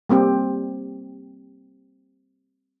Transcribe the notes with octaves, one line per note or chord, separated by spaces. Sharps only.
G3 A#3 C4 G4